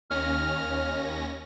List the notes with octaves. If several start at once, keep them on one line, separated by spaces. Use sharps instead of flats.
D#2 C#4 F6 A#6